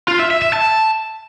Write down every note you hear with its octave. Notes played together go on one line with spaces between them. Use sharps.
F4
E5
E5
E5
A5